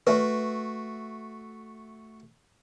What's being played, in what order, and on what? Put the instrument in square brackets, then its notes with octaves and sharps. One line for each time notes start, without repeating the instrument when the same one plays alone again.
[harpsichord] A3 F#4 [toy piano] B4 E5